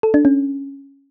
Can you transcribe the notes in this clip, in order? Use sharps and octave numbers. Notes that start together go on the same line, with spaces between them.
A4
D4
C#4